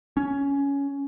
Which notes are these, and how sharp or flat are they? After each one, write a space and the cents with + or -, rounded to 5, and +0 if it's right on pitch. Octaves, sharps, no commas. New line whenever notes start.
C#4 +15